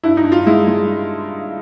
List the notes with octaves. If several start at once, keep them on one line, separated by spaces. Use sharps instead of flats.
G2 E4
D#4
G2
F4
G#3 E4
G#3